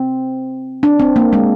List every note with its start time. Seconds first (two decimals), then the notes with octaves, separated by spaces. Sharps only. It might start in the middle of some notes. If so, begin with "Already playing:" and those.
Already playing: C4
0.83 D4
1.00 C4
1.16 A#3
1.33 G#3